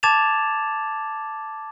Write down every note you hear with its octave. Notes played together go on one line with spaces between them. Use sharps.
A5 D6 G#6 A6 E7 F7